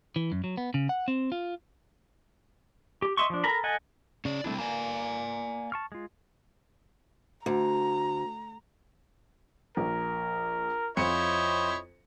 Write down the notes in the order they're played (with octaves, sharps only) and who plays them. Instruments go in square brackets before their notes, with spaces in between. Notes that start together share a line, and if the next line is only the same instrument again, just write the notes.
[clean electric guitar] E3
F#2
F#3
B3
C#3
F#5
C4
F4
[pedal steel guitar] G4
D#5 E5 C6 C#6
F3 D4
A4 A#4 A#5 B5
A4 D#5 F#5 G#5
[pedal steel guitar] C#3 [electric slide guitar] C#4 D5
[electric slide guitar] G3 C4 E4 [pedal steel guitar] A3 D4
[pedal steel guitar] A#3 [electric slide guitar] D5 G#5 A#5
[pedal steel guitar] A5 C#6 F6
G#3 F4
[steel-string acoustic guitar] D2 [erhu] A#5
[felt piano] A#1 [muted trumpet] A#4
[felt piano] F2 F4 C#7 [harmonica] E4 C5 C#5 [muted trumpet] D#5